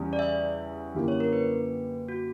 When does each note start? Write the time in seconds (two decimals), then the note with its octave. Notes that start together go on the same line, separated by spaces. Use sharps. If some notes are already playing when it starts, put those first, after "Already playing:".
Already playing: E2 C#3 G3 C#4
0.13 D5
0.19 E5
0.95 F#2 D3 A#3 E4 G4
1.08 C#5
1.20 A#4
1.33 B4
2.09 F#4